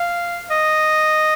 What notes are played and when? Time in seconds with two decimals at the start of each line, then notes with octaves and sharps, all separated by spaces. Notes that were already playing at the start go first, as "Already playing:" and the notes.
Already playing: F5
0.50 D#5